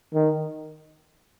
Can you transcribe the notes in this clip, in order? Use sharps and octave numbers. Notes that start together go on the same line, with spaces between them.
D#3